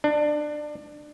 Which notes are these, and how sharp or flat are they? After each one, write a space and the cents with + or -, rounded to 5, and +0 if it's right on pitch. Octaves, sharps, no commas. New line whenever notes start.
D4 +20